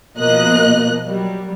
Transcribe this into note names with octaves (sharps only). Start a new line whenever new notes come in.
B2 F3 A#3 D#5 F#6
F#3 G3